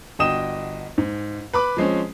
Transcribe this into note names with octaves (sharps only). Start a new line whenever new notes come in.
G1 F#4 D#5 G5 D#6 E7
G#2
B4 B5 D6
F3 G#3 C4 C#4